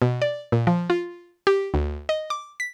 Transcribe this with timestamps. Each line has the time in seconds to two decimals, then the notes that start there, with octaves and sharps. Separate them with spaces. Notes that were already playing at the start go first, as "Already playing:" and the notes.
0.02 B2
0.22 D5
0.52 A#2
0.67 F3
0.90 F4
1.47 G4
1.74 D2
2.09 D#5
2.30 D6
2.60 B6